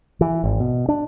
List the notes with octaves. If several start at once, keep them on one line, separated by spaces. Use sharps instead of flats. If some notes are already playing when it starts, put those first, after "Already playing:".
E3
G#1
B2
D4